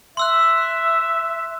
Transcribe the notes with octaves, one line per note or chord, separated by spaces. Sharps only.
E5 C6 E6 F#6